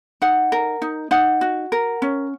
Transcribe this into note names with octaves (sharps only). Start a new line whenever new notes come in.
D#4 F#5
A#4
D#4
D#4 F#5
F#4
A#4
C#4